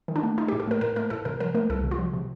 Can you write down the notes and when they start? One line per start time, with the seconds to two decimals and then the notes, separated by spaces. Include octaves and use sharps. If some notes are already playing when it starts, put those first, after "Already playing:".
0.08 D#3
0.16 D4
0.23 A3
0.38 A3 D#4
0.48 A2 G4
0.60 A4
0.67 A3 A#4
0.81 A2 A#4
0.96 A3 A#4
1.10 A2 A4
1.25 C3 A#4
1.40 F3 A#4
1.54 A3 A#4
1.70 C2 A4
1.84 C3
1.91 F4
1.98 F3
2.14 C3